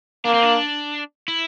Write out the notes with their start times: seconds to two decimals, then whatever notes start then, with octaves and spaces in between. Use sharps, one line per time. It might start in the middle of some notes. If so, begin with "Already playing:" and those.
0.25 A#3 D4
0.34 C4
0.43 D4
1.28 E4